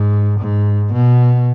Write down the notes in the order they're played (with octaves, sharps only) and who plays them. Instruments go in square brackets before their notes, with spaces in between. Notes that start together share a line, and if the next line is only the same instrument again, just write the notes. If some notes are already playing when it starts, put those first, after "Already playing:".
Already playing: [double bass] G#2
G#2
B2